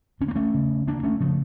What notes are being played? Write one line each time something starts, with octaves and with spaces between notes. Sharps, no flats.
D2 C#4
A#3
A3 C#4
C#3
D2 A#3 D4
A3 C#4
C#3 F3 A3